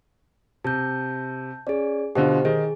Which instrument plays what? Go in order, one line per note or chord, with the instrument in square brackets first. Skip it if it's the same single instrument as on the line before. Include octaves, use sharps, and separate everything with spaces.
[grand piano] C3 [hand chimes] A5 G6
[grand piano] C#4 [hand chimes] G#4 D5
[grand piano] B2 D3 F4 [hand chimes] G4 C5
[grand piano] D#3 [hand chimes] G#4